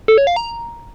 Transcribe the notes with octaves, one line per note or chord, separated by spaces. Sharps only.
A4
C#5
F5
A#5